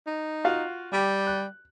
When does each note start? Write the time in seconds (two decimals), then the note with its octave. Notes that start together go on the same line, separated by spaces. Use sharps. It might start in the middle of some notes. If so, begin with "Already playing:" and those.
0.07 D#4
0.45 F4 F#4 F5
0.93 G3 G4
1.27 F#6